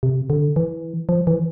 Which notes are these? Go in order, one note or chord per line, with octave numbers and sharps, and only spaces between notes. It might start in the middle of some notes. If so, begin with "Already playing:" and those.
C3
D3
E3
F3
E3